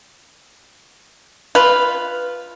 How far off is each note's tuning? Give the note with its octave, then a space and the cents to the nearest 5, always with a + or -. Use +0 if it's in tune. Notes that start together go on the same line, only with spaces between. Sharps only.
F4 +0 B4 +0